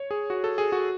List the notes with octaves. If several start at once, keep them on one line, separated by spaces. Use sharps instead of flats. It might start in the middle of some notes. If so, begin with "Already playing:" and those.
Already playing: C#5
G#4
F#4
A4
G#4
F#4